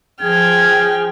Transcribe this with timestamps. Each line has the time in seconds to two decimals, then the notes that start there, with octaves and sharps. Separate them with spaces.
0.22 F3 G#4 G5 F6 G#6